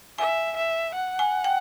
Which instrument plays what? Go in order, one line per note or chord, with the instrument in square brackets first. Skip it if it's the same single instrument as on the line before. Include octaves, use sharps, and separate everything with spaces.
[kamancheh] E5 [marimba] G#5
[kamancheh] E5
F#5
[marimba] G#5
G5